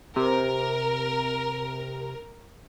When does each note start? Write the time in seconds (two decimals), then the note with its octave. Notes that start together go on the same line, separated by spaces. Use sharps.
0.16 C3 A#4